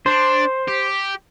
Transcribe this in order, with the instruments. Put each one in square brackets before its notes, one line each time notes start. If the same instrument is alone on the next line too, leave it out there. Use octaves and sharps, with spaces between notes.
[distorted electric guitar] D4 [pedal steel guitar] C5
[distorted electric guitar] G4